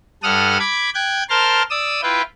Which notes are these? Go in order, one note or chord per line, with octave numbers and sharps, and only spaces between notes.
G2 A4 F#5 D#6 F6
B5 D6 G#6
G5 F#6 G#6
A#4 C5 A5 C6 F6
D5 D#6 E6
E4 F4 B4 G5